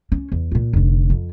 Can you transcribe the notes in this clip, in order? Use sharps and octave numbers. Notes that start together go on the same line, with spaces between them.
C#4
E2
A#2 F4
F1 D3
F2